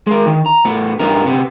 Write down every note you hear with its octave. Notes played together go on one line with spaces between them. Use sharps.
G#3 A#4
D#3
A#5
A2 B3
G2 B3 D#4 A#4
C3 B3